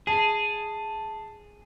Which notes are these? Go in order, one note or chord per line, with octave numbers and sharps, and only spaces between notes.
G#4 A5